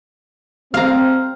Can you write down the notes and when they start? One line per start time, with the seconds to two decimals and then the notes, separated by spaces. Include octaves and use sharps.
0.74 C4 F5 A#5